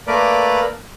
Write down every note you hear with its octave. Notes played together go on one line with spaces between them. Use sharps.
A3 A#3 A#4 B4 D5 D6